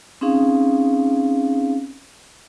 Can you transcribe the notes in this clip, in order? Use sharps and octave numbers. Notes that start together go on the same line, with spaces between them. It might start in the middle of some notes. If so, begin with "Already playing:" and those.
C4 C#4 D#4 G#4 F5